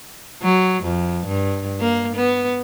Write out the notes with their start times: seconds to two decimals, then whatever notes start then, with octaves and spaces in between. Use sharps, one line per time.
0.43 F#3
0.83 F2
1.26 G2
1.80 A#3
2.16 B3